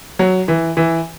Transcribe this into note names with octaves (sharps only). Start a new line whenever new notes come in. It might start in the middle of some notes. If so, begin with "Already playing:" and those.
F#3
E3
E3